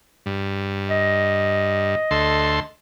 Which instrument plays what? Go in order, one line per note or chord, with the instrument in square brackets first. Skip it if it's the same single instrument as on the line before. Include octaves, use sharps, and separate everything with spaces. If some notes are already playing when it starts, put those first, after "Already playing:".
[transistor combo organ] G2
[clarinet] D#5
[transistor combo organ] D2 A4 C6